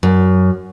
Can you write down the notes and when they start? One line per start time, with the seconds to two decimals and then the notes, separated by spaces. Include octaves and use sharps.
0.03 F#2